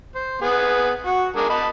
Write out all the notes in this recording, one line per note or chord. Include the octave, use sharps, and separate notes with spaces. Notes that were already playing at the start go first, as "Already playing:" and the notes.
C5
B3 G#4
F#4
G#3 D4 A#4
D#5 A5 B5